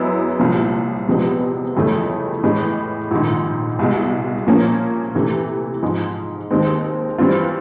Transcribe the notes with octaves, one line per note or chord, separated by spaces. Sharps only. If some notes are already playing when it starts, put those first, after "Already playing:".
Already playing: F#2 G#3 B3 E4
C2 A#2 F3
E2 C3 F3 G#3 B3
G1 F2 C#3 E3 A3
A2 E3 G#3
A#1 G#2 D#3
C2 B2 G#3
A#2 F3 A#3 C#4
C3 E3 A3
G#2 F3 G#3
D#2 D#3 G#3 C4
G2 E3 G3 C4 F4